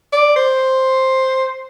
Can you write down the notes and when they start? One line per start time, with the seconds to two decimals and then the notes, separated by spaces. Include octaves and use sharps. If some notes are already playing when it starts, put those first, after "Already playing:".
0.13 D5
0.36 C5